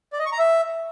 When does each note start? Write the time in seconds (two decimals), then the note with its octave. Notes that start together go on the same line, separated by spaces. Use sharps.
0.13 D5
0.19 D#5
0.26 C#6
0.32 A#5
0.39 E5